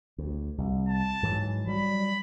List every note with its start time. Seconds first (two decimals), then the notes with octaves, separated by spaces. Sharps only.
0.18 D2
0.58 C2
0.88 A5
1.23 G#2 E3 F#3
1.67 F#3 G3 B5